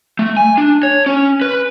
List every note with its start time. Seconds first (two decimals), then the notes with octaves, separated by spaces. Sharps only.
0.19 A3
0.37 G#5
0.58 D4
0.83 C#5
1.06 C#4
1.41 B4